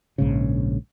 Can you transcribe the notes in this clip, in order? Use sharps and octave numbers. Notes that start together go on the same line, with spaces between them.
A#1 G#2 C#3